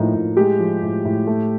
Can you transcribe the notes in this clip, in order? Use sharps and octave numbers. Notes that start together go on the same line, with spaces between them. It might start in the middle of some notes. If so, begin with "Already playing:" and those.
Already playing: A2 F3 A#3 D#4
A2
G#3 G4
F3
A2
A2
A3